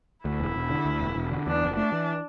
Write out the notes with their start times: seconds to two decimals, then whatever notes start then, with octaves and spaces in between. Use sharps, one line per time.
0.25 D2 E4
0.40 E1
0.56 E1
0.70 D3
0.85 D2
1.00 E1
1.16 E1
1.31 D3
1.47 E2 D4
1.61 F#1
1.77 A3 D4
1.92 E3